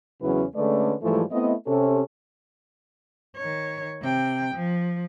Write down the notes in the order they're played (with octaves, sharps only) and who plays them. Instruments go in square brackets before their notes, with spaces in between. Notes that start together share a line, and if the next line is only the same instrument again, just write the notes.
[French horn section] E2 C#3 F#3 C#4 E4 B4
D3 G#3 A3 C#4 B4 D5
G#2 E3 F3 G3 A3
A3 B3 C4 E4 D#5
C3 C#4 A4
[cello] D#3 C#5
C3 G5
F3